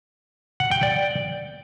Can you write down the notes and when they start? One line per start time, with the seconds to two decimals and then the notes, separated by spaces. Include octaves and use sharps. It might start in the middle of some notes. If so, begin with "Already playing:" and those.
0.60 F#5
0.71 G5
0.83 D5